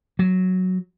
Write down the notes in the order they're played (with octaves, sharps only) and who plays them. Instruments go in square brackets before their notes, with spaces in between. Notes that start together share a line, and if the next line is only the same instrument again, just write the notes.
[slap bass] F#3